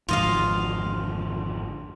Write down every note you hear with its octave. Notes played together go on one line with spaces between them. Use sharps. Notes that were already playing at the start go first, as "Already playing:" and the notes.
G#1 F2 D3 F4 D#5 F5